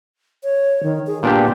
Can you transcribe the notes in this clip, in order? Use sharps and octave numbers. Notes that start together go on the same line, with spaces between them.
C#5
D#3
G#4
A#2 B3 D4 G4